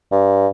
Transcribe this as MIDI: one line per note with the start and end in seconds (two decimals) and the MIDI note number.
0.12 0.47 43